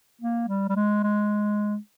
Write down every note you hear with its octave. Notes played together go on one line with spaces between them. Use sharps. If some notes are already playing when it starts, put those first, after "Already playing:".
A#3
G3
G3
G#3
G#3